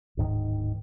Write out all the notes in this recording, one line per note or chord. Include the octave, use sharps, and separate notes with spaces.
D1 G#2 D#3